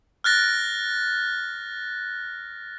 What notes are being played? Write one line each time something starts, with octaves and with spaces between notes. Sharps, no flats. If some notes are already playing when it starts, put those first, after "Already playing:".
F6 F#6 A6 A#6